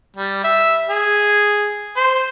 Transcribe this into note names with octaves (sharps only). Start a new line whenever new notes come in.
G3
E5
G#4
C5